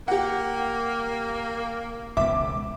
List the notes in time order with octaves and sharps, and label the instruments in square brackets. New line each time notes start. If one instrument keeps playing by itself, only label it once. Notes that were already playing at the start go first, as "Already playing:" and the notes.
[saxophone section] A#3 [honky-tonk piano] G4 F#5
[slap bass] E1 C#2 B3 [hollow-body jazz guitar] E5 [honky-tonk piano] D6